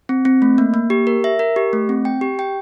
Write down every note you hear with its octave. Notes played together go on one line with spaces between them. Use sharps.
C4
C4
A3
A#3
A#3
G4
A#4
E5
A#4
G4
A3
C4
G5
G4
G5